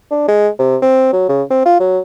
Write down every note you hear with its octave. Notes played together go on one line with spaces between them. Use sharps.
D4
G#3
C3
C4
F#3
C#3
C4
F4
F#3